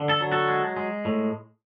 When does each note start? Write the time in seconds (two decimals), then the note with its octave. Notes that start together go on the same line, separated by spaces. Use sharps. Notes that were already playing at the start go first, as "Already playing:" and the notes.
Already playing: D3
0.09 A4
0.20 F#3
0.32 F#4 A4
0.48 G#3
0.77 G#3
1.05 A2